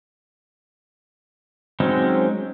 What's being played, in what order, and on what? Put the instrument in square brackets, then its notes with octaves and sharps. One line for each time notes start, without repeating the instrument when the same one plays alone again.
[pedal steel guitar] F#3 G#3 C4 C#4 D#4